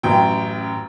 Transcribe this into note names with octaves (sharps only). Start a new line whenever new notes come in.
A1 F#2 G5